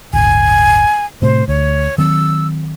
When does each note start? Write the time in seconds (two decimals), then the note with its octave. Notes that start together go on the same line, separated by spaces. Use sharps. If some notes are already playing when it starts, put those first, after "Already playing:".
0.13 D1 G1 G#5
1.22 A2 C3 A3 C5
1.48 D2 C#5
1.98 D#3 F#3 C4 E6